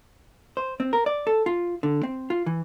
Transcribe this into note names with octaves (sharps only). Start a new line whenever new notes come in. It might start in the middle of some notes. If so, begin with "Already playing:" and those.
C5
C4
A#4
D5
A4
F4
D3
C4
F4
E3